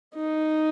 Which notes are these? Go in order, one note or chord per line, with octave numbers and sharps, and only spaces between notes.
D#4